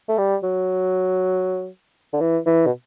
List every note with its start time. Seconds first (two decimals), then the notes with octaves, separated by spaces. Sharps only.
0.09 A3
0.18 G3
0.43 F#3
2.13 D3
2.20 E3
2.46 E3
2.67 B2